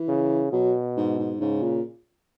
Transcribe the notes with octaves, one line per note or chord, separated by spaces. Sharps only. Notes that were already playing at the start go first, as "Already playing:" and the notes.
Already playing: E3
C#3
B2 F#3
G#2
G#2
G#2 C#3
A#2